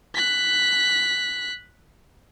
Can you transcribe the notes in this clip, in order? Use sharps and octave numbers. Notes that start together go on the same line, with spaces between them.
F#6 B6